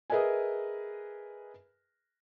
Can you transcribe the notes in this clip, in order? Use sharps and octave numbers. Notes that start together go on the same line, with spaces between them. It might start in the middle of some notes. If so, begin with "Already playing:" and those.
G#4 A#4 B4 D#5 E5 G#5